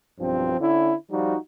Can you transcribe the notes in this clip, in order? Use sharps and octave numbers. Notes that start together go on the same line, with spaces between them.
B1 G2 F3 C4
D3 C#4 E4
F3 G3 D#4 F4 F#4